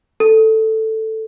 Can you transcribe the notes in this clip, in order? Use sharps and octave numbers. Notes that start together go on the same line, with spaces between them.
A4